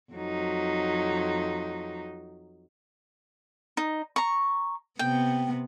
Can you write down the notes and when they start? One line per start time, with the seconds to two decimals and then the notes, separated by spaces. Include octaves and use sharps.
0.13 F2 F#3 D#4
3.77 D#4
4.16 A#5 C#6
4.99 C3 B3 G5